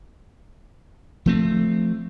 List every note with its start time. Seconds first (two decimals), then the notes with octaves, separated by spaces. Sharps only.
1.26 F3 A3 C4